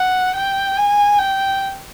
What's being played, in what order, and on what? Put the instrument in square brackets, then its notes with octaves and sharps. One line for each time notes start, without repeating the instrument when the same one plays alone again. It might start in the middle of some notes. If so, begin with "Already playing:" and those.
Already playing: [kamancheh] F#5
G5
G#5
G5